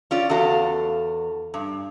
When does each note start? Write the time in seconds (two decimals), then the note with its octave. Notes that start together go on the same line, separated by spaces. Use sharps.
0.11 C#4 F4 D5
0.29 E2 F#4 A4 F5
1.54 G2